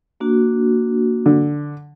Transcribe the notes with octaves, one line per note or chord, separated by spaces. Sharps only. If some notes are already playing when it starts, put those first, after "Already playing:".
A#3 D4 F#4
D3